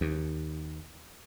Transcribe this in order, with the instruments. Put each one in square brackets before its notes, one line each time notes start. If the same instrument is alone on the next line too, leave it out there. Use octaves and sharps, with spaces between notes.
[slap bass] D#2